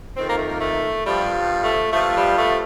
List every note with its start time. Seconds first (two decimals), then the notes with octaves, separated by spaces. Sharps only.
0.16 F2 D#3 C4
0.27 A#3
0.38 A3
0.48 A#3
0.60 A3
1.04 G2 F3 G3
1.62 A3
1.92 G2 F3 A3
2.14 G3
2.36 A3